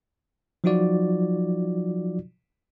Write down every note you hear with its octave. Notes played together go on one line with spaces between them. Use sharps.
F3 F#3 D#4 F4 F#4 D5